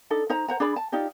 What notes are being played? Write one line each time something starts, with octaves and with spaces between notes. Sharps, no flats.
D4 D#4 A4
D#4 C5 A#5
C5 F#5 A#5
D4 G#4 D5 B5
A5
D#4 F4 G4 D5